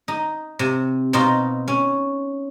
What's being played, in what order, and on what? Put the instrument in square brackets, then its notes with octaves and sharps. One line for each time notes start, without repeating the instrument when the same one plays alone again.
[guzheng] D#4
C3
B2 C4 D#4 F4
C#4